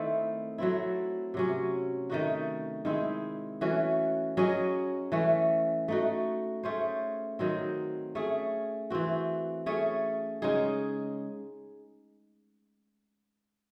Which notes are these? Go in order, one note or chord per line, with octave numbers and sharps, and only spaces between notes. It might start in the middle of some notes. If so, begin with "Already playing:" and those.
Already playing: D#3 A3 C4 E4
F#3 A3 C4 E4
C3 F#3 C#4
D#3 A3 D#4 F#4
D#3 G#3 C4 E4
E3 A3 C#4 F#4
F#3 C#4 G#4 D#5
E3 A3 C#4
A3 D#4 F#4
A3 C#4 G#4 C5
D#3 F#3 C4
A3 C#4 G#4
E3 C4 F#4
A3 C#4 G#4 C#5
C#3 G#3 D#4 G#4